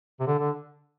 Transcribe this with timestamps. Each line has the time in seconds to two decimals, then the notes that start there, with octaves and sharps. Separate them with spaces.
0.20 C3
0.27 D3
0.39 D3